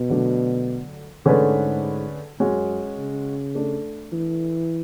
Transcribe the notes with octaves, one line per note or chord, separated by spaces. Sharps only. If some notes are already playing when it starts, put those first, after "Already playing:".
Already playing: B2
D3 F#3 A3 D4
G#2 D3 A3 C#4 G#4 B4
F#2 G#3 C#4 F#4
C#3
A3 D4 A4
E3